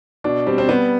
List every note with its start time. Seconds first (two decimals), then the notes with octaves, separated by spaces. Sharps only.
0.24 B2 D4
0.47 G3 C4
0.58 C4
0.69 G3 B3